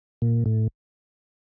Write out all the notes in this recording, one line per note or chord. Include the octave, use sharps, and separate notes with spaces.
A#2
A2